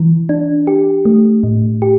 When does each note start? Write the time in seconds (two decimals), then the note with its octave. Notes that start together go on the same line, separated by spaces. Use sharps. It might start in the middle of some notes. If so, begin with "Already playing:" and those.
Already playing: E3
0.29 D4
0.67 G4
1.05 A3
1.43 A2
1.82 G4